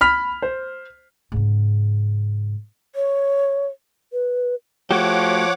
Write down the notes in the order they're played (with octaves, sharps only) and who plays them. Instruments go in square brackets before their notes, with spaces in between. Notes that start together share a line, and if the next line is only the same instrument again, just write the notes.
[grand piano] B5 F6 B6
C5
[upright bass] G#2 C#3
[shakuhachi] C#5
[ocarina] B4
[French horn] F3 [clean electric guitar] A3 F#4 G4 [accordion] C#5 F#5 D6